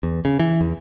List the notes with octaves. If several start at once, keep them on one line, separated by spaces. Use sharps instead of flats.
E2
C#3
E3
E2